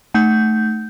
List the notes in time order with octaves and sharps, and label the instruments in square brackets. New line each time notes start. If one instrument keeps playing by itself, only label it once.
[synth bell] A3 G6